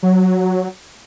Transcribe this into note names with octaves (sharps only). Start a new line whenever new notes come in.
F#3